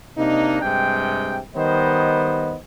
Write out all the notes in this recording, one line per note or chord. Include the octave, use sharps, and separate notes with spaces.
C3 A#3 D4 D#4
G2 C3 G#3 G5
D#3 G3 B3 C5 D#5